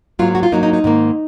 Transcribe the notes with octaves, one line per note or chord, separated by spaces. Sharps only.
G#2 F#3 A#3 F4
F#4
F4
G#2 F#3 A#3 D#4
D#4
D#4
G#2 D#3 A#3